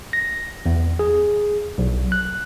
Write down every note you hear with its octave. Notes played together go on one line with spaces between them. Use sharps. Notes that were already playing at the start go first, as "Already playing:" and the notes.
A#6
E2
G#4
B1
F#6